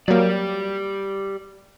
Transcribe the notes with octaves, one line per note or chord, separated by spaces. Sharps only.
F#3 A#3 G4 D5